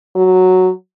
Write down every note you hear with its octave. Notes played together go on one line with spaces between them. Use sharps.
F#3